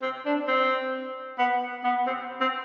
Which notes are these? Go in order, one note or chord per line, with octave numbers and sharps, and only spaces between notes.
C4
D4
C4
B3
B3
C4
C4